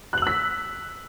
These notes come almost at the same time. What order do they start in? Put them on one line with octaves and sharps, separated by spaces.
F#6 F#7 E6 B6